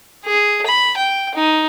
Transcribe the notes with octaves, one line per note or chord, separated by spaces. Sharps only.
G#4
B5
G5
D#4